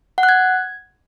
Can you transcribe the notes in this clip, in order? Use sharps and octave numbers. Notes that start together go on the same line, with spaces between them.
F#5
F#6
G#6